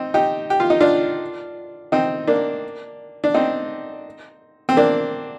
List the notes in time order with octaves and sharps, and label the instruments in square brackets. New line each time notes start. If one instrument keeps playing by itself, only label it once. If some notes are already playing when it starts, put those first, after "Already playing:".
Already playing: [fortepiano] C4 D#4
D#4 G4
G4
F4
D#4
D4 F4
C4 D#4
A#3 D4
D4
C4 D#4
C4
A#3 D4